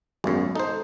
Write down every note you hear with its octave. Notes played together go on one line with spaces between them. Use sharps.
G#1 F#2 F#3 G#3 B3
D#4 A4 C5